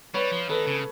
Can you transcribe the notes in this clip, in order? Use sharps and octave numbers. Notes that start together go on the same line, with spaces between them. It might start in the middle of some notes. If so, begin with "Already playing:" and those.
G3 B4 C#5
F3
D#3 A4 B4
C#3